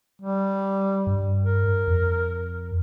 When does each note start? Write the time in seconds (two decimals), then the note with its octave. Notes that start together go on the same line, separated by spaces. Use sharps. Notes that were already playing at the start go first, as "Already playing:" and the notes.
0.22 G3
1.07 G2
1.44 A#4
1.87 F2